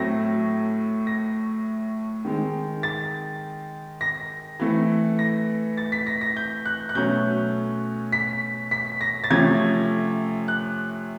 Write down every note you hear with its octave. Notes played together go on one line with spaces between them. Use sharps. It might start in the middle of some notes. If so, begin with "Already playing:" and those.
Already playing: A2 F#3 A3 C4 A#6
A#6
D#3 G#3 C4
A6
A#6
E3 A3 C4
A#6
A6
B6
A#6
A#6
G6
F#6
F#6
B2 F#3 A3 C#4 G6
B6
B6
A#6
A6
C3 F3 A3 C#4 G#6
F#6